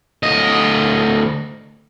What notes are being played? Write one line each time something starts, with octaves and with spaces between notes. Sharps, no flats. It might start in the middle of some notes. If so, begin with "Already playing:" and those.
D2 D#5